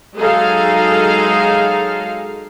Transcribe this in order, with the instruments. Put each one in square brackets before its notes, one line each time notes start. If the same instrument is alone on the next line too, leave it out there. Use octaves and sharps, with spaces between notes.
[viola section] F#3 G#3 D#4 G#4 A4 F5